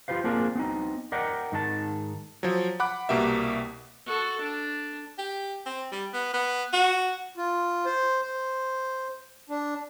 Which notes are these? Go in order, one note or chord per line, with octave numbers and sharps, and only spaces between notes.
F4 G4 B4 C5 F5
A#3 C4 D4 F4 G#4 A#4
B3 C4 D#4
A#4 D5 D#5 F#5 G5
G#2 D#3 G#4 A5
F3 F#3
F#5 B5 D6 F#6
C2 B2 A#3 G4 E5
F#4 A4
D4
G4
C4
G3
B3
B3
F#4
F4
C5
C5
D4